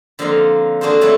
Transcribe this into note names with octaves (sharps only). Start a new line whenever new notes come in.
D3 F3 A#3 C4 D#4 F5
A#3 D4 F#4 G#4 A4 C5
F#3 A3 C4 D4 E4 C#5